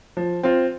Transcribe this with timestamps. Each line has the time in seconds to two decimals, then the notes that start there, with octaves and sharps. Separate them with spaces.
0.17 F3
0.43 C4 F4